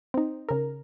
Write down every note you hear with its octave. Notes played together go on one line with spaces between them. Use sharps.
C4 D#4
C#3 A#4